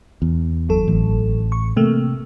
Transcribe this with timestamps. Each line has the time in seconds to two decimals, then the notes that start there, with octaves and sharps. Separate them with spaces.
0.22 E2
0.69 G1 F#3 A4
0.88 A1
1.52 C#6
1.76 C3 A3 A#3